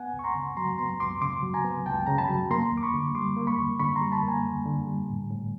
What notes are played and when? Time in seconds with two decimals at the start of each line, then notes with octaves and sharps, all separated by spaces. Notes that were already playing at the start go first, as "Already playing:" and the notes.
Already playing: B3 F#5 G#5
0.14 C#2
0.19 C#6
0.24 A#5 C6
0.35 C#3
0.57 F#3 A#5 C6
0.78 B3 A#5 C6
1.00 C#2 C6 D6
1.21 C#3 C6 D6
1.43 F#3
1.54 G#5 A#5
1.64 B3
1.86 C#2 G5 A5
2.06 C#3 A#5
2.18 A5 B5
2.29 F#3
2.51 A#3 A#5 C6
2.72 D#2
2.77 D6
2.83 B5 C#6
2.94 D3
3.15 G3 C6 D6
3.36 A#3
3.47 B5 C#6
3.59 D#2
3.79 D3 B5 C#6
3.96 A#5 C6
4.01 G3
4.12 A5 B5
4.23 A#3
4.28 G#5 A#5
4.44 D#2
4.66 D3
4.87 G3
5.09 A2
5.30 A2